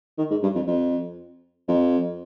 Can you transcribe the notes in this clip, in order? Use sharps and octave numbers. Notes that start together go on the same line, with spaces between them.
D#3
G#2
G2
F2
F2
F2